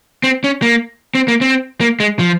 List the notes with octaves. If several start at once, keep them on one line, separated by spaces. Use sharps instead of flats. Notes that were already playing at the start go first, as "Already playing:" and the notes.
C4
C#4
A#3
C4
A#3
C4
A#3
G#3
F3